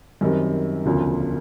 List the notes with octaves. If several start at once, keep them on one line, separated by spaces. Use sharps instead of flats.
F#2 D#3 G3 C4
E1 D2 C#3 F3